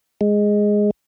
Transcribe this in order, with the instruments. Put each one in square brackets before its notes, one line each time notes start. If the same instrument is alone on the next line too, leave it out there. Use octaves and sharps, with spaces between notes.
[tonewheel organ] G#3